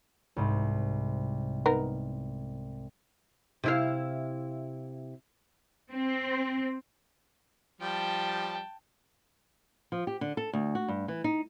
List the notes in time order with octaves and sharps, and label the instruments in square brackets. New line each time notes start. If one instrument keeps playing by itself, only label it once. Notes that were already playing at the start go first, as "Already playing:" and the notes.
[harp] C2 G#2
[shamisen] B3 D#4 A#4
[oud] C3 E4 F5
[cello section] C4
[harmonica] F3 G3 [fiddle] G5 A5
[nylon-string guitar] F3
G4
D3
A4
D2
F#4
G2
E3
D#4